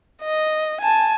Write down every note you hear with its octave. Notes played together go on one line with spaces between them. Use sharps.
D#5
G#5 A5